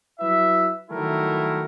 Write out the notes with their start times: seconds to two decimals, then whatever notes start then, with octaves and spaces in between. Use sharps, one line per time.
0.20 F#3 E4 B4 E5
0.91 D#3 F#3 G3 A3 E4 A#4